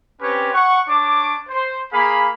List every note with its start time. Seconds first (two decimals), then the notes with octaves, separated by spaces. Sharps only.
0.21 C4 C#4 G4 B4 C#5
0.53 F#5 C#6
0.88 D4 C#5 D6
1.48 C5
1.92 A#3 G#4 F5 B5